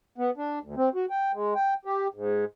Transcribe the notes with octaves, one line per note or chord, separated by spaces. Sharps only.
B3
D4
D2
C4
F#4
G5
G#3
G5
G4
G#2